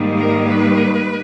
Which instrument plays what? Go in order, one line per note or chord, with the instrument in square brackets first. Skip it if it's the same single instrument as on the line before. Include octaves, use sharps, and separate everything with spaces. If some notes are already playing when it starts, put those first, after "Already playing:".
Already playing: [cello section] G#2 D#3 G3 A#3
A#4
B4